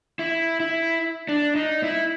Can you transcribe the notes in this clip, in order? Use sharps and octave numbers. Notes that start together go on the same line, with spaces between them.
E4
E4
D4
D#4
E4